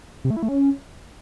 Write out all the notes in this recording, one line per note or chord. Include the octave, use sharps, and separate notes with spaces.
C3
A3
E4
A3
C#4